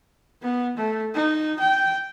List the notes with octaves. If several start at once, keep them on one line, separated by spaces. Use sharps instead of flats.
B3
A3
D#4
G5